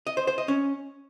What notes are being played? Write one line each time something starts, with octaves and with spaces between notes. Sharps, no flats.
D#5
C5
C5
D#5
C#4